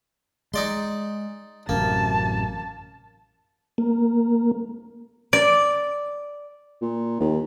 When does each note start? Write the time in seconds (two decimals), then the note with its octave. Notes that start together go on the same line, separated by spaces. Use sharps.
0.54 G#3 D#4 D5 C6
1.69 A1 F#2 C3 A#3 A5
3.78 A#3
5.33 D5
6.81 A#2
7.20 D#2